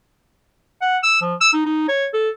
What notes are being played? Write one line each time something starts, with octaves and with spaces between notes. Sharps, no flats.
F#5
E6
F3
E6
D#4
D#4
C#5
A4